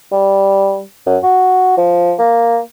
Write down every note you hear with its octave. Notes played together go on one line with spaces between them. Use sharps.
G3
F#2
F#4
F3
A#3